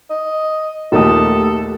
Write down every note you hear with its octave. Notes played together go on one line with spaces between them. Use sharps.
D#5
A#1 D#2 A3 D#4 G4 A4 D#6